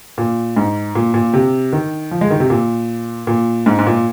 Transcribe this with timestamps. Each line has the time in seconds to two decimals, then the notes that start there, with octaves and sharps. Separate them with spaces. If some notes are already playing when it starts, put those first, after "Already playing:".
0.18 A#2
0.56 G#2
0.95 A#2
1.14 A#2
1.33 C3
1.73 D#3
2.11 F3
2.21 G#3
2.30 D#3
2.40 C3
2.50 A#2
3.27 A#2
3.66 G#2
3.79 G#2
3.86 A#2